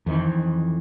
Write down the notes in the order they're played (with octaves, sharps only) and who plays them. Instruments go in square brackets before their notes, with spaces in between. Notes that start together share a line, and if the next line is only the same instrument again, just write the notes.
[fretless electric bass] F2 D#3 E3